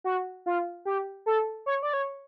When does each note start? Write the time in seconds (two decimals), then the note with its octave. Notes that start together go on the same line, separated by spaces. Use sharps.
0.04 F#4
0.46 F4
0.85 G4
1.26 A4
1.66 C#5
1.83 D5
1.93 C#5